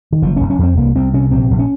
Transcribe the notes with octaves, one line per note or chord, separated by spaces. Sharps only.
D#3
F#1 F3
F#1 C#4
C#4
F2 C4
C2 A#3
C2 C4
C3 C#4
A#1 C4
A#1
C#4